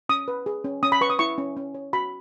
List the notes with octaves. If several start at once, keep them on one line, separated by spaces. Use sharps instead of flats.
C#4 D#6
B4
G#4
C#4
C#4 D#6
B5
B4 C#6
D#6
E4 C#6
C#4
C#4
C#5
F#4 B5